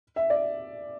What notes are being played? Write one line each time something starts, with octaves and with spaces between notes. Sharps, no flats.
E5
D5